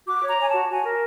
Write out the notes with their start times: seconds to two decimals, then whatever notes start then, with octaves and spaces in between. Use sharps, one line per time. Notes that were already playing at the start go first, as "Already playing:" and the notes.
0.06 F#4 D6
0.22 C#5
0.27 A#5
0.38 C#5 G#5
0.48 F#4 A5
0.69 F#4 G#5
0.85 A#4